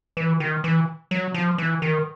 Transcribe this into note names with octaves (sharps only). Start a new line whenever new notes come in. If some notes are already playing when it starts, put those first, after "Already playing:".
E3
D#3
E3
F#3
F3
E3
D#3